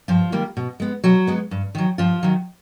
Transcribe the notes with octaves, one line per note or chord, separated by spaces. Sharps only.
G2 F3 F4
D#3 G3 A#3
B2
G#3 B3
B2 F#3 F#4
G#3 B3
G2
D#3 F#3
G2 F3 F4
D#3 F#3